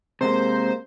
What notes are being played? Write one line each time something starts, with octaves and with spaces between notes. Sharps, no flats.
C3 G#3 A#3 C5